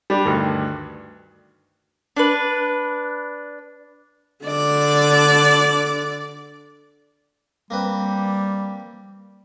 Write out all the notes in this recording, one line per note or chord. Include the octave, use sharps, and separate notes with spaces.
G3 D4
D2 G2 D#3
D4 B4
D3 D5
G3 A#3 C4 B4